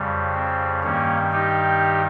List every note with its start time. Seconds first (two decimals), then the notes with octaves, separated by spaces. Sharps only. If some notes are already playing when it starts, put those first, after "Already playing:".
Already playing: F2 C#3 G3
0.34 C4
0.83 G2 D#3 G3 A#3 C#4
1.33 D#4 G4